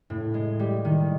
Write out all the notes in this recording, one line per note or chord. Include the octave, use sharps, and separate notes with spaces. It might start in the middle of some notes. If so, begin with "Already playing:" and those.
A2
G#3
G3
D#3